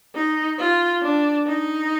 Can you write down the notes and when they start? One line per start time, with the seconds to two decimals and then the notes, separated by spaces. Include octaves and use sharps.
0.15 D#4
0.59 F4
1.02 D4
1.47 D#4